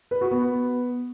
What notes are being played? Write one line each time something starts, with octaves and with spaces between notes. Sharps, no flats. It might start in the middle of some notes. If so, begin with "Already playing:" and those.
B4
F#4
B3